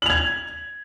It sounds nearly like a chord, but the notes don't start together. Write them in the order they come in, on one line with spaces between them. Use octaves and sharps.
F#7 F7 G#6